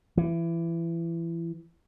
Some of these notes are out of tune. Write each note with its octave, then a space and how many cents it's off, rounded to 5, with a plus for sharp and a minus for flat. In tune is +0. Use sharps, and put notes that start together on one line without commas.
E3 +25